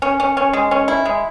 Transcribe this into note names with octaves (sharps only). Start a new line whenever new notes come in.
C#4
C#4
C#4
G#3
C#4
E4
G#3